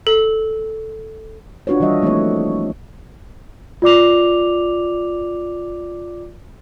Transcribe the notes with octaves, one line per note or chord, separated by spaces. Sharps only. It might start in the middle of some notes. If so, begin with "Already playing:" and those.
A4
D4 F4 F#4 B4 C#5
D#3 E3 G3 D#5 E5
F3 A3 A#3 C4 E4 C#5
F4 D5 D6 F7